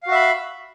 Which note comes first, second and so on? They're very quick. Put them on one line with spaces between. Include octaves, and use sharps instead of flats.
F5 F#4 E5 B5